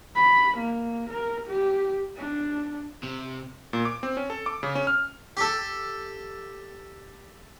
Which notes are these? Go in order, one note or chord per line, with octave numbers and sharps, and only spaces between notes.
B5
A#3
A#4
G4
D4
C3
A#2
D6
C4
C#4
A4
D6
C#3
C#4
F6
G4 A4